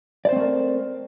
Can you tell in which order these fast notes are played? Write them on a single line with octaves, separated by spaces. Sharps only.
D5 C5 C4 A3 A#4